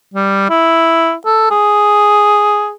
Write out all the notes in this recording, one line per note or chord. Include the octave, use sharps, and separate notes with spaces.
G3
E4
A4
G#4